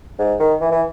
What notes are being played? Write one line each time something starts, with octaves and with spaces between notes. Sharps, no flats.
G#2
D#3
E3
E3